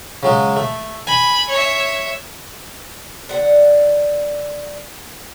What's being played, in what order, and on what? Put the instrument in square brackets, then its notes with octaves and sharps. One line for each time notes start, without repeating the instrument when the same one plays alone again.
[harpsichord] C#3 F#3 G#3
A3
[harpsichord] G#5 [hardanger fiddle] B5
[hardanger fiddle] C#5 E5
[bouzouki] D3 F#5